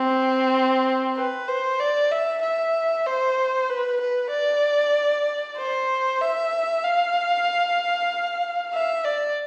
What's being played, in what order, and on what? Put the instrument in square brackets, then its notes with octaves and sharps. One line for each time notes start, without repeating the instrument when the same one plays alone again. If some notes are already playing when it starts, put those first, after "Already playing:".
Already playing: [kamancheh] C4
B4
C5
D5
E5
E5
C5
B4
B4
D5
C5
E5
F5
E5
D5